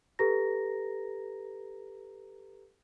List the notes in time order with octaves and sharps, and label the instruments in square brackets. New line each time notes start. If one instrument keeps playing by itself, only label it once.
[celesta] G4 A4 B4 A#5 A#6